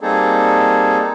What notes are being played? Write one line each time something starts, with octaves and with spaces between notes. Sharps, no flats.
G3 A#3 C4 D#4 G#4 A4